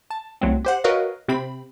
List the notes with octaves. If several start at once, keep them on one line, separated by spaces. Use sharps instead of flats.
A5
C2 F#3 A3 C4
G4 C5 F#5
F#4 A#4 B4 C#5 D#5 F5
C3 C4 B5